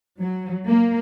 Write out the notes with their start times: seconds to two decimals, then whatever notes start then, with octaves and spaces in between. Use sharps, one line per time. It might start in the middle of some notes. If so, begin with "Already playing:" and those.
0.21 F#3
0.64 A#3